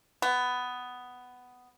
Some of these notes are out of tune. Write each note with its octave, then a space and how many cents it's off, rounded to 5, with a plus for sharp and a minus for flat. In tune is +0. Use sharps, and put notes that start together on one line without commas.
B3 +10